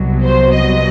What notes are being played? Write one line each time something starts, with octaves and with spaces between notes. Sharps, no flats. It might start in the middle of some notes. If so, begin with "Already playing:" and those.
Already playing: C2 B2 F#3
C5
D#5